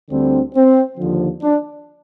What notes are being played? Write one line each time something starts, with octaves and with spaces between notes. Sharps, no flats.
D2 D3 G3 C4
C4
D#2 D3 F3
D4